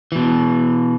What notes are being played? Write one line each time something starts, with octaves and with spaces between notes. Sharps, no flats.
B2 E3